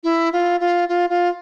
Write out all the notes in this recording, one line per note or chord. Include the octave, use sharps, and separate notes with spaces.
E4
F4
F4
F4
F4